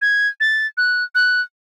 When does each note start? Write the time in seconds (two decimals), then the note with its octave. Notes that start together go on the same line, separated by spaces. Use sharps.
0.02 G#6
0.40 A6
0.77 F#6
1.15 F#6